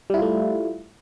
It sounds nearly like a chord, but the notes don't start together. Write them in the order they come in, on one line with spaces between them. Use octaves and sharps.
G3 E4 F4 A3